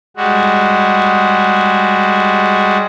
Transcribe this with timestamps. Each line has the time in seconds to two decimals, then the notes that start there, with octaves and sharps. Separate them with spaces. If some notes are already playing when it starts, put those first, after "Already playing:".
0.17 G3 G#3 F#4